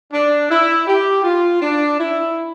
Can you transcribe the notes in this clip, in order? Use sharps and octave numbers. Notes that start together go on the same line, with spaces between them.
D4
E4
G4
F4
D4
E4